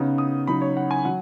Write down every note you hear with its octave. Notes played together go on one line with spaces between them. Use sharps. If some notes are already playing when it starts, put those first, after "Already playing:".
Already playing: C#3 B3 D#4
D#6
C#3 F#3 D#4 B5
C#5
F#5
G#5
F#3 F#5